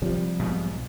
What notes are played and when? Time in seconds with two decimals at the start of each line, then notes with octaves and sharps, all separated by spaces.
0.02 C3 F3 G3
0.40 B1 G#2 B2